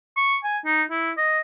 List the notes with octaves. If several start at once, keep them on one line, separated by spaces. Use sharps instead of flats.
C#6
G#5
D#4
E4
D#5